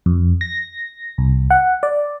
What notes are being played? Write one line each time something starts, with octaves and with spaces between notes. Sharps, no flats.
F2
A#6
C2
F#5
D5